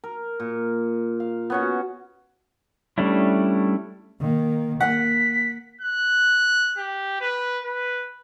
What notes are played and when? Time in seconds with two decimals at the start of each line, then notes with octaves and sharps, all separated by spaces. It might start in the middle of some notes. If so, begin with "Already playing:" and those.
0.04 A#4
0.40 A#2
1.20 F5
1.50 B3 C#4 F#4
2.98 G3 A3 C#4 D4 E4
4.20 D#3 A#3
4.81 A#3 F#5 B6
5.81 F#6
6.78 G4
7.21 B4
7.64 B4